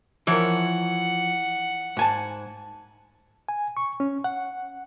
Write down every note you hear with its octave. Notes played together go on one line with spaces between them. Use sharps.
E3 F3 A#4 C#5 F#5
G#2 G#5 A5
G#5
C#6
C#4
F#5